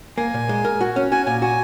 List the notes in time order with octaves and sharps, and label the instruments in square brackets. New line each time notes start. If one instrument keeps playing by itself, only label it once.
[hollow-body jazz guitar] A#3 [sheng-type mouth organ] G#5
[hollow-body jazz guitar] A#2
G#3
A#4
F#4
C#4
[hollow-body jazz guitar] F#4 [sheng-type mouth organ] G#5
[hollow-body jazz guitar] A#2 [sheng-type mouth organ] G#5
[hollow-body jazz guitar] F#4 [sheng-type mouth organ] G#5